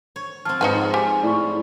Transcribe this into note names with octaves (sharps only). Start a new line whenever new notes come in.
C#5
F3 C4 A5 F6
G#2 D#4 B4 F#5 G#5 B5
G4 G#5
A2 D5 C#6